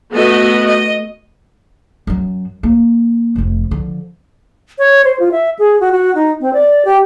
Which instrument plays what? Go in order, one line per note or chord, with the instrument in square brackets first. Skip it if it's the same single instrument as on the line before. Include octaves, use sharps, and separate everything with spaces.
[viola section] A3 B3 F#4 D#5
D#5
[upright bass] F#2 F#3
A#3
F1 C3
D3 F3
[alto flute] C#5
C5
F4
E5
G#4
F#4
F#4
D#4
C4
D5
G4